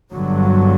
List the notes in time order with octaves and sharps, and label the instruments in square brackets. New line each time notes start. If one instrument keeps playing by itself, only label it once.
[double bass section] G1 G2 D3 F#3